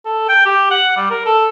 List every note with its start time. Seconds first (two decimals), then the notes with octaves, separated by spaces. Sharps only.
0.05 A4
0.29 G5
0.46 G4
0.71 F#5
0.96 G3
1.10 A#4
1.26 A4